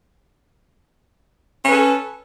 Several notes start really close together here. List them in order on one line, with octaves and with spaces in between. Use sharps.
C#4 B4 A4